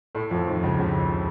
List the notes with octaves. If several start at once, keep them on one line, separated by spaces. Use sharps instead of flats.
A2 A3
F2 F3
D#2 D#3
C#2 C#3
C#2 C#3